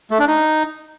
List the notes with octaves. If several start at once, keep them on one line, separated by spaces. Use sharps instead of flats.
A3
D4
D#4